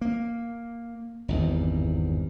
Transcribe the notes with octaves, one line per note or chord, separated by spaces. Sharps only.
A#3
G#1 E2 G2